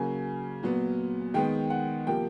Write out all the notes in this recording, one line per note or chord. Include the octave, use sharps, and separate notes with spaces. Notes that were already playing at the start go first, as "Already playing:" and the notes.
Already playing: C#3 F#3 A#3 G#5
A#2 F#3 B3
D#3 G#3 B3 G5
F#5
C3 F3 A#3 G5